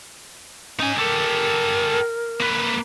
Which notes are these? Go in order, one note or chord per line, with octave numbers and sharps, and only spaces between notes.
C#4 D#4 G#5
G4 A4 A#4
A#3 B4